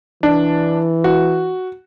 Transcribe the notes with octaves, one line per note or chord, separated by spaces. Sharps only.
E3 D4
F#4